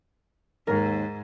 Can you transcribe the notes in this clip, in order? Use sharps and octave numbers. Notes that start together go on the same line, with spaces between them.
D#2 G#2 A#4